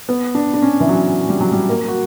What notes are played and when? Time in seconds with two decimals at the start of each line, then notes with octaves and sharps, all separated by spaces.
0.09 B3
0.35 D4
0.54 D4
0.62 C#4
0.80 E3
0.89 F#3
1.29 G3
1.41 F#3
1.52 G3
1.69 A#3
1.88 F#4